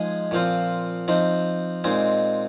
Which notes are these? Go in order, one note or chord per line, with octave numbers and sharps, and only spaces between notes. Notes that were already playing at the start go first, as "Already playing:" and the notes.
Already playing: F3 G#3 D#4 G#4 D#5
A#2 F3 C4 F4
F3 C4 D#4
A#2 G#3 C4 D#4